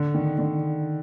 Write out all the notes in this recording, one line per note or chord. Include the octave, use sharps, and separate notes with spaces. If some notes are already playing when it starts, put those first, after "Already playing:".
Already playing: D3
D#3
D3